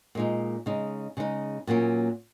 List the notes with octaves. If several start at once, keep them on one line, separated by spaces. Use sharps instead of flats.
A#2 G#3 D#4
C#3 G#3 D#4
C#3 G#3 D#4
A#2 F#3 A#3 C#4